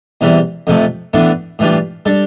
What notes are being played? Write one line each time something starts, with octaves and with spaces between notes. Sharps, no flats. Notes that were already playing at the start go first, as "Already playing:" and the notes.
E2 C3 E3 G3
F2 C3 F3 A3
A2 E3 B3 D4
A2 E3 G3 D4 F4
G3 D4 A4